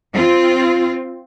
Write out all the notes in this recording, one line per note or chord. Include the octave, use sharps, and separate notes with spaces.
C4 F4